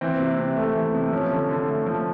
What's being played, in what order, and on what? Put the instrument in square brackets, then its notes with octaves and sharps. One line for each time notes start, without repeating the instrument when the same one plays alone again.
[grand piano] E3 C4
C3
C3
A3
E3
C3
F3 C#4
D3
D3
A3
F3